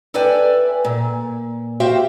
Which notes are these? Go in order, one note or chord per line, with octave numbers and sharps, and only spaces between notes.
A4 B4 D5 E5 G5 G#5
A#2
F#4 G4 C5 E5 F5 G5